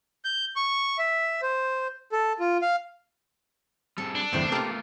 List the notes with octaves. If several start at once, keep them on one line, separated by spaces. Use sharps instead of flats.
G6
C#6
E5
C5
A4
F4
F5
G3 C4 G#4 A4
D4
G1 E2 C3 A3 B3 C4 C5
A#3 F4 G4 A4